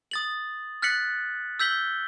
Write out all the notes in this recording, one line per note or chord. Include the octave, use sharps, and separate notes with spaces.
D#6 A6 F#7
F6 F#6 A6 B6 C#7 F#7
E6 G6 B6 F#7 G7